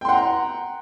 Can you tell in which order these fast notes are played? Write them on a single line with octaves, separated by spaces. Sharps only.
G5 C6 F#5 A#5